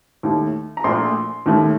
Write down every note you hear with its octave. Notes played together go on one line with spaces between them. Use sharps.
D#2 D#3 A3
A#5
A#1 A#2 A3 C6
D#2 D#3 A3